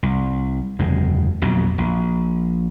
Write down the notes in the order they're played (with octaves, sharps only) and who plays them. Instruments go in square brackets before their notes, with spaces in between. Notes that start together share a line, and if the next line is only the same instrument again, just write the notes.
[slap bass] C2
F#1 E2 C3 G#3
A#1 F2 B2 F#3
A#1